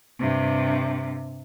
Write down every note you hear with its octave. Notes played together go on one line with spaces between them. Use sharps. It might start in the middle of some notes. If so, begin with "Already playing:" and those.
G2 C3